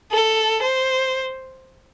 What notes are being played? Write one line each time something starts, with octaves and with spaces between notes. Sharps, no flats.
A4
C5